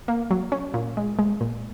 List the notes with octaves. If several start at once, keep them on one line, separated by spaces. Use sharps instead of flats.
A#3
F#3
C#4
A#2
G#3
G#3
A#2